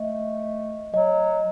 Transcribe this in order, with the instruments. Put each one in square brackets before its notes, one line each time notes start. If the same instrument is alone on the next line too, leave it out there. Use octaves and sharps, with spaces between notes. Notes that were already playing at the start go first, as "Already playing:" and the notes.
Already playing: [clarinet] A3 [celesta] D#5
[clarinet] F#3 [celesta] D#5